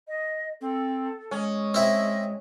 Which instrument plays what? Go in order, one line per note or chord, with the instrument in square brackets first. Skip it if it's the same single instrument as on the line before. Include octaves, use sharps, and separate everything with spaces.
[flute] D#5
[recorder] C4 [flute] A4
[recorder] G#3 [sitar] C#4
[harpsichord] C4 E4 [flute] D#5